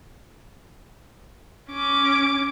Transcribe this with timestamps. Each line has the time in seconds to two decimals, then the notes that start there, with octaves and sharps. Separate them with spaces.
1.71 C#4 D6